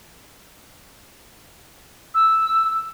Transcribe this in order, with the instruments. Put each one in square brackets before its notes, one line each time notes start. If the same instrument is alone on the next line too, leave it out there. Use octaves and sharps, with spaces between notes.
[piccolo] E6